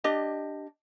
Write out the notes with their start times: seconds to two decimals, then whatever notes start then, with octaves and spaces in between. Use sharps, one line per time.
0.04 D4 G4 D#5